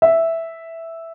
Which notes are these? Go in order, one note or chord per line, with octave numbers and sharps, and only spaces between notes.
E5